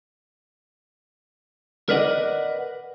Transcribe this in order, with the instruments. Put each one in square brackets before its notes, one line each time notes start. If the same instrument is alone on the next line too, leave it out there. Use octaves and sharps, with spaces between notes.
[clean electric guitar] A#4 B4 D5 D#5 F#5